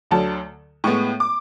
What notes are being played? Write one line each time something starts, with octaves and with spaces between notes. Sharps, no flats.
D2 D3 F#3 A5
A2 G#3 B3 C#6
D6